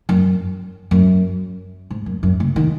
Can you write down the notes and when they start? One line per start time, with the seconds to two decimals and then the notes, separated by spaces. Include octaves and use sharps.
0.09 F#2
0.91 F#2
1.90 G#2
2.06 F#2
2.23 F#2
2.40 C#3
2.56 D#3